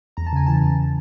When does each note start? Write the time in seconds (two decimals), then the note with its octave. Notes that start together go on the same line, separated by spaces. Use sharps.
0.17 E2 A#5
0.27 A5
0.33 C#3 G#5
0.46 E3 A5
0.63 E2